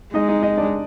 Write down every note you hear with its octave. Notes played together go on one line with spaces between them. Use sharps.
G#3 D#4 D#5
D#4 D#5
D#4 D#5
D4 D5